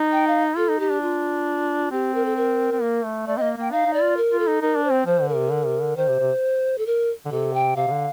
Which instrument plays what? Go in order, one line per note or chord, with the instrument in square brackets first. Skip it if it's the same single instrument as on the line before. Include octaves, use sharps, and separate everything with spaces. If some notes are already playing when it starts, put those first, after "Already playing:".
Already playing: [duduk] D#4
[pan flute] G5
F5
[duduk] F4 [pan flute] A4
[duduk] D#4
[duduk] D#4 [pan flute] G4
[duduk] D4
[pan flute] F4
[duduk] C4 [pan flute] G4
[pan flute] A#4
A4
A#4
[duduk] C4
A#3
A3
[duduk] A3 [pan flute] D5
[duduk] A#3 C4 [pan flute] D#5
[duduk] A#3 [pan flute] G5
[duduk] D#4 [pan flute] F5
[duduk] D#4
[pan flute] D5
[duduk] F4
[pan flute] A#4
[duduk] F4
[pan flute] A4
[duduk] D#4
[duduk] D#4 [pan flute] A#4
[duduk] D4
[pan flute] C5
[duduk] C4
[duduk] F3 [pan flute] C5
[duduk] D3
[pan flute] A#4
[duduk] C3
D3
C3
D3
[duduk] D#3 [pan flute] C5
[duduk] C3
C3
[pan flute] A4
A#4
[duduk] D3
[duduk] C3 [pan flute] A4
[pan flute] G5
[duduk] C3 [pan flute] F5
[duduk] C3
D3